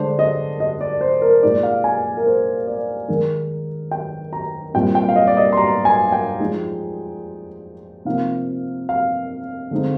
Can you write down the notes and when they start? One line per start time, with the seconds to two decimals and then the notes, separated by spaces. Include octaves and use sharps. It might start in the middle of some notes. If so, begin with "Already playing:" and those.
Already playing: D3 G#3 D4 C5
0.19 D#5
0.60 D#5
0.81 D5
1.01 C5
1.22 A#4
1.43 A#2 G#3 D#4 D5
1.63 F5
1.84 G#5
2.17 A#4
2.26 C5
2.67 D5
3.08 D#3 G#3 D#4 A#4
3.91 G5
4.33 A#5
4.74 A#2 G3 C4 G5
4.95 G5
5.09 F5
5.16 D#5
5.27 D5
5.37 D#5
5.53 C6
5.57 A#5
5.85 G#5
6.12 G5
6.40 F3 G#3 D#4
8.05 C3 F3 A#3 D#4 F5
8.89 F5
9.71 D3 G#3 C4 D#4